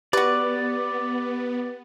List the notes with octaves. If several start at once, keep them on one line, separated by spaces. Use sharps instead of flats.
B3 F#4 G4 B4 D5 A6